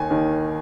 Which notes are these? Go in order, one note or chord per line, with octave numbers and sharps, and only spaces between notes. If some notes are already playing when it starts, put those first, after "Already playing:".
Already playing: D#2 D#3 G#5
D#2 D#3